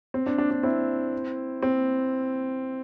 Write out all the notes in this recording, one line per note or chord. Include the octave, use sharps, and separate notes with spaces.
C4
D4
D4
D4
C4 E4
C4